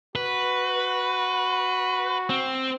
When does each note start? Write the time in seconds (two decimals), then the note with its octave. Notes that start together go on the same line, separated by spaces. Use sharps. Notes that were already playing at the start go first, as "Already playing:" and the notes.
0.15 F#4 B4
2.30 C4